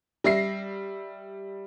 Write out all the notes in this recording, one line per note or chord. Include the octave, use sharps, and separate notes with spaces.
G3 E5 A#6 C7